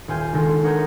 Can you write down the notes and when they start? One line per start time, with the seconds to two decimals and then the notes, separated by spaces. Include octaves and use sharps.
0.08 D#1 F4 C5 G#5 G6
0.33 D#3 G#3 D4 A4 C5
0.64 A#4 C#5 F#5 A#5 D#6 G6